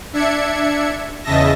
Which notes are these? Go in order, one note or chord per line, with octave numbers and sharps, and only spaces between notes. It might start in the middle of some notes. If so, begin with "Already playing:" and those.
D4 E5 G#6 C#7
E2 C#3 D#5 E5 A5 A#6